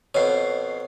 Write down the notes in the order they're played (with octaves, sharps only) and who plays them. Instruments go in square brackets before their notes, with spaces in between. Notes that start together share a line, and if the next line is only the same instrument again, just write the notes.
[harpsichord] F2 B2 [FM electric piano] C#5 C7